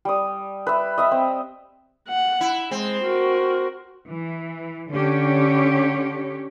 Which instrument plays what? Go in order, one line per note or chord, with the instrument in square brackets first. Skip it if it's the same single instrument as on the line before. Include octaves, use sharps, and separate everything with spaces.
[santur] G3 D#6
B4 E5
D#5 E5 B5
C4
[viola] F#5
[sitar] E4
[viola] G#3 [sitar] C4
[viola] F#4 A#4
[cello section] E3
D3 C#4 G4 C#5